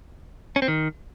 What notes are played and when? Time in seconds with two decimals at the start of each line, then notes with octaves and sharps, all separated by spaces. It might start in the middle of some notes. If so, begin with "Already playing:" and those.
0.56 C#4
0.62 C4
0.68 D#3